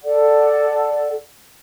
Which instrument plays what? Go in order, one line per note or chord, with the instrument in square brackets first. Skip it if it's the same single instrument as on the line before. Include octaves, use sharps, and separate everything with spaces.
[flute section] A4 D5 F#5